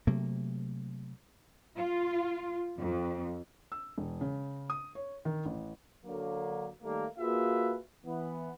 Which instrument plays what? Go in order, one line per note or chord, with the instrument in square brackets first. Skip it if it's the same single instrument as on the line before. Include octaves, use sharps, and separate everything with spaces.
[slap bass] C3 F#3 A3 A#3
[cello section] F4
F2
[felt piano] E6
E1
C#3
D#6
C#5
D#3
A1
[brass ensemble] D3 F#3 A#3
D#3 G3 A3 A#3
A#3 F4 F#4 G#4 B4 E5
E3 B3